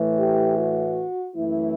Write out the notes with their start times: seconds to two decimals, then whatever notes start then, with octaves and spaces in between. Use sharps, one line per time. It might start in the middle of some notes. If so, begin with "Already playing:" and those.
Already playing: A2 E3 A3
0.19 G4
0.58 F#4
1.36 F#2 E3 A3 E4